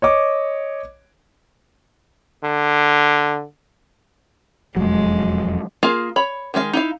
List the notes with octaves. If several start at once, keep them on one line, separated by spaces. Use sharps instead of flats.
C#5 D#5 D6
D3
E1 F2 F#3 G#3
A#3 F4 G#4 F5
C#5 B5
D#3 G#3 F#4 F5
D#4 E4 F5